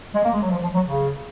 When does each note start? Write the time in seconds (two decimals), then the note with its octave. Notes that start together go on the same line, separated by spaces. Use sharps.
0.15 G#3
0.24 A#3
0.33 G#3
0.42 F#3
0.51 F3
0.63 F3
0.75 F#3
0.86 C#3